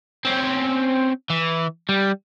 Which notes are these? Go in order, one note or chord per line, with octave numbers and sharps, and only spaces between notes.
C4 C#4
E3
G3